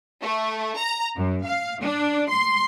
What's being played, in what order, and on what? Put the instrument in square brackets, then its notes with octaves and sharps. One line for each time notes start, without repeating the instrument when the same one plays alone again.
[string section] A3
A#5
F#2
F5
D4
C6